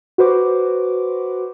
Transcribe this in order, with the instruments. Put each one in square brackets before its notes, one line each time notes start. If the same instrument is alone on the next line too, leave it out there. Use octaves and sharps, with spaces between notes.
[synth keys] F#4 B4 C5 D6